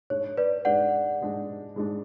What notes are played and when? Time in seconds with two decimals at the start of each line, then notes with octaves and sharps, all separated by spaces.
0.10 G#2 G#3 D4 C#5
0.37 B4 D5
0.65 G#2 G#3 D4 D5 F#5
1.21 G#2 G#3 D4
1.76 G#2 G#3 D4